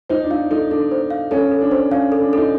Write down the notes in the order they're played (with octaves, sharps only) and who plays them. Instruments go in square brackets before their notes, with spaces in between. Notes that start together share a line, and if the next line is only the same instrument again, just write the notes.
[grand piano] D#4 [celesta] C5
[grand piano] D4
[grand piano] D#4 [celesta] F5
[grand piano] D#4 [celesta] A4
[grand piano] D4 [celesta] A4
[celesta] C5
F5
[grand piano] C#4 [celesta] A4
[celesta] A4
[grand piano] D4
[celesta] C5
[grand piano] C#4 [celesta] F5
[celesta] A4
[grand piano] D4
[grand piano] D#4 [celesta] A4